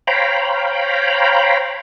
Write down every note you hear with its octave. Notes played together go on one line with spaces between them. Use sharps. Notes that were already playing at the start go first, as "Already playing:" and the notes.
C5 C#5 F5 G5 A#5 B5